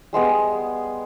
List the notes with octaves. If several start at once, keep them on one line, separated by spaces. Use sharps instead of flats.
G3 G#3 B3 G#4